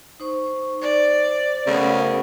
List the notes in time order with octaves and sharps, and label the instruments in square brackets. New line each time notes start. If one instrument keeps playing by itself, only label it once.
[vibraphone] D#4 C5 C#6
[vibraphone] C5 [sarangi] D5
[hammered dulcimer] F#2 A3 B3 [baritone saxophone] C#3 [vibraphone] A#4 C5